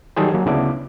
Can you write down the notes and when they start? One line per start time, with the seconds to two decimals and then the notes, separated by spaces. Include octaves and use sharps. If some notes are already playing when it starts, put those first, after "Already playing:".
0.17 D#3 F#3 G3 G#4 A4 C5
0.34 F#3 A#3
0.46 D2 C#3 B3 D4 E4 D6